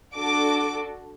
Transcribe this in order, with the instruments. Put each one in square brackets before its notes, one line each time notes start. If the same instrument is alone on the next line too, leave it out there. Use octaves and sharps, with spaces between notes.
[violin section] D4 F#4 A4 D6